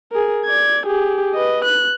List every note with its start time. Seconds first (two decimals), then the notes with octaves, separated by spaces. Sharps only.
0.12 G#4 A#4
0.45 D5 G#6
0.86 G4 G#4
1.35 B4 D#5
1.65 F#6